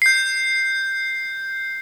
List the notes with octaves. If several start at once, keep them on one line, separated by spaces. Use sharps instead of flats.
G6 C7